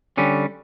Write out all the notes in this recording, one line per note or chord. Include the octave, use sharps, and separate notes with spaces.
D3 G3 C#4